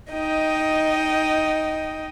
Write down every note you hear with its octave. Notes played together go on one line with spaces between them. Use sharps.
D#4 D#5 G5